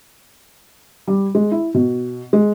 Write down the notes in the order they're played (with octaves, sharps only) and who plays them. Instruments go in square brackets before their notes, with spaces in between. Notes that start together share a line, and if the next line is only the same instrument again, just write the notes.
[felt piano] G3
G#3
E4
B2
G#3